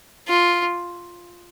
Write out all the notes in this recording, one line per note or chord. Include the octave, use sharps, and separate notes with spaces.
F4